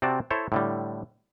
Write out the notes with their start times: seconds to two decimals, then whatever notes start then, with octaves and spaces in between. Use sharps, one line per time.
0.02 C3 C4 F#4 D5 A5
0.31 E4 A4 C5 C#5
0.52 A2 D3 G3